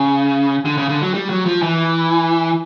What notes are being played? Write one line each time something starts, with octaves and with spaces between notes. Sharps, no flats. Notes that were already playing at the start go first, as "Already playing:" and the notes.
Already playing: C#3
D3
C#3
D3
F#3
G3
F#3
F3
E3